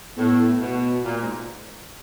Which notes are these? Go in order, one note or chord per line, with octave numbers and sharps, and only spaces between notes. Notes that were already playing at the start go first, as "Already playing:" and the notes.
A2 B3
B2
A#2
G#2